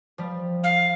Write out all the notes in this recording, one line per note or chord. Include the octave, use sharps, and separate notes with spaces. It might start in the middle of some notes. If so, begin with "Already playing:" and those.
F3 G3
F5